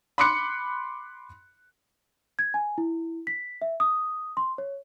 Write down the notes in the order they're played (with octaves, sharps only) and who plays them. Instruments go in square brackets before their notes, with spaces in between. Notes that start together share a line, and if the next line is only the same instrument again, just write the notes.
[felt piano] B5 C6 D6 F#6 C#7
[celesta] G#6
G#5
E4
B6
E5
D#6
C6
C#5